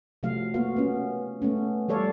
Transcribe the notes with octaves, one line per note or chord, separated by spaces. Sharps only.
C3 F3 F#3 A3 F5
A#3 B3 F4 F#4 F5
B3 C#4
A3 B3 C#4
F3 G3 A4 C#5 D5 F5